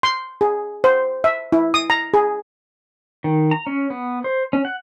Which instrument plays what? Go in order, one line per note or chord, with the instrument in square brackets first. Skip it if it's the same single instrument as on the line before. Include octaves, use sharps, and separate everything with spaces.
[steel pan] C6
G#4
C5
E5
E4
D#6
A#5
G#4
[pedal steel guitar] D#3
A#5
C#4
B3
C5
C#4
F#5